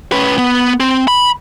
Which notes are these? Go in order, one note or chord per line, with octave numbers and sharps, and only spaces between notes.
C#4 B4
B3
C4
B5